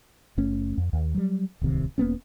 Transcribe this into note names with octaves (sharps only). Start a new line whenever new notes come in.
F#1 A3 C#4
F2
D#2
F#3 G3
D1 C2 C3 D#3
E1 A#3 B3 C#4